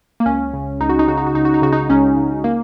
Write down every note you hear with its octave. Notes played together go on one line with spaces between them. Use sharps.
A#3
C#2 C#4
C#3
C#2 D#4
F#4
D#4
C#3 F#4
D#4
F#4
C#2 D#4
F#4
D#4
C#3 F#4
D#4
C#2 C#4
C#3
A#3